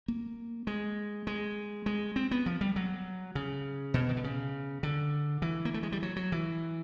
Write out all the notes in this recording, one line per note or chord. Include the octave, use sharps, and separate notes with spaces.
A#3
G#3
G#3
G#3
C4
B3
F3
G3
F#3
C#3
B2
D#3
D3
C#3
D3
E3
A#3
A3
G#3
G3
F#3
F#3
E3